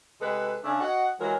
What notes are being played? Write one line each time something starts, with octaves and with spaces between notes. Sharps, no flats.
C3 G#3 A4 B4
C#3 A3 D4
F#4 D#5 F#5
E3 F#3 G#3 F4 A#4